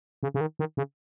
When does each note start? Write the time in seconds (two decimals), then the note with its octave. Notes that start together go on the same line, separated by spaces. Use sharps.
0.23 C#3
0.34 C#3
0.41 D#3
0.59 D#3
0.77 C#3